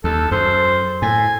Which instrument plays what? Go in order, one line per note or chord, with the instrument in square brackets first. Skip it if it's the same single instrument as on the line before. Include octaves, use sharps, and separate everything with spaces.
[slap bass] D#2 [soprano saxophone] A4
[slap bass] F#2 [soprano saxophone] C5
[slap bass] A2 [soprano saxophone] G#5